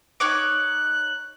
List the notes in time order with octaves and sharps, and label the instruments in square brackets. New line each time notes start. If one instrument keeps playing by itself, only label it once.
[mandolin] D#4 C#5 D6 [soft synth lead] F#6